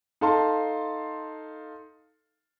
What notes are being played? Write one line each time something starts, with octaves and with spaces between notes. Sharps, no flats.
D#4 A4 F5 A5 C6